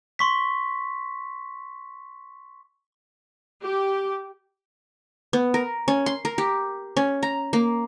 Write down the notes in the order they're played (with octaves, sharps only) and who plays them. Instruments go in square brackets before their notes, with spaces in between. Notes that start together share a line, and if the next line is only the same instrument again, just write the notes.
[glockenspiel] C6 C#6 B6
[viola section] G4
[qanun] B3
A#4
C#4
C6
A#4
G4
C#4
A#5
A#3